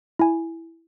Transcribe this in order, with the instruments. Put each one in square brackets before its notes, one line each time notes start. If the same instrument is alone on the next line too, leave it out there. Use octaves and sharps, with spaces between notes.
[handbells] E4 G#5